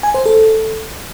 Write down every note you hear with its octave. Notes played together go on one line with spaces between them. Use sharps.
G#5
C5
A4